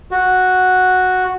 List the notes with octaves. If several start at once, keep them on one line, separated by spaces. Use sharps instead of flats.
F#4